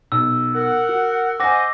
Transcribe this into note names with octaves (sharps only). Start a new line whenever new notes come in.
B1 E6
A#4 F#5
F#4
C5 D#5 F#5 G#5 D6 A#6